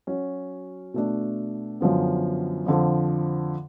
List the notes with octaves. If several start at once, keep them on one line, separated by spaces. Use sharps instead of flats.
F#3 C#4 F#4
B2 A3 D4
F#2 D3 F3 B3
F2 D3 F3